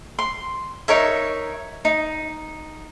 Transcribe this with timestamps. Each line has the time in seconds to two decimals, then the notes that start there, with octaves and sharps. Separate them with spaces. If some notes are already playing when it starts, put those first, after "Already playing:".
0.19 C6
0.88 D#4 A#4 C#5 E5
1.85 D#4